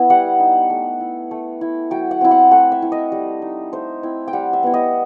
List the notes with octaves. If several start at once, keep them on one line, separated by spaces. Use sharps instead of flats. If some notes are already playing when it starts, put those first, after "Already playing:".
Already playing: B3 E4
G3 F#5
D#4
A3
E4
A3
E4
F#3 G5
F#5
C4 E4
F#5
A3 F#5
E5
E4
D#5
G3
D#4
A3 C5
C4 E4
G5
G3 F#5
E5
B3 E4
D#5